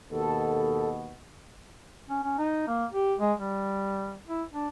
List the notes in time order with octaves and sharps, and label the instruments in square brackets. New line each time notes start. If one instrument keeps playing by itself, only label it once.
[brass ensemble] D#2 B2 [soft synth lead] A4
[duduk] C#4
C#4
D#4
A#3
G4
G#3
G3
E4
D4